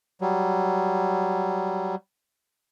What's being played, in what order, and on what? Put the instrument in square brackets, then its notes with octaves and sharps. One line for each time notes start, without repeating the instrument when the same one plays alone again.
[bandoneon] F#3 G3